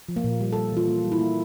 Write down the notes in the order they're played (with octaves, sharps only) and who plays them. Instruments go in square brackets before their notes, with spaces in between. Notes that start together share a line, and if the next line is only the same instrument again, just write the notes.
[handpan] F3
A#3
A#2
G3
G3 A4
E3 F4
A#3
G3
E4
A#3